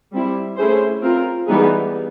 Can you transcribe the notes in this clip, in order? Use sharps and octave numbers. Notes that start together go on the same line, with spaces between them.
G3 C4 E4
A3 C#4 E4 G#4 C5
C4 F4 A#4
E3 G3 B3 D#4 G#4